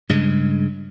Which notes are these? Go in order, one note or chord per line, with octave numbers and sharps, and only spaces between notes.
G2 C#3 G#3